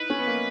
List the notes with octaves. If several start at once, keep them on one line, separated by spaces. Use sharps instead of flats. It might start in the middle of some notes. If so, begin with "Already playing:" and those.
Already playing: D#4 E4 B4
C#4
B3
A#3